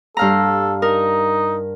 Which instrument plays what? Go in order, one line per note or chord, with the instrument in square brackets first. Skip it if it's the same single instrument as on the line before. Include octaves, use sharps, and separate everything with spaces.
[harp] G2 F5 A#5 [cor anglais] A4
[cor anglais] D#4 [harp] A#4